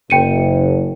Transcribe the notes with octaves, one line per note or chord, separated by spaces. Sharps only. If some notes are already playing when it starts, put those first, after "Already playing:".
F#1 G5 C#7 D#7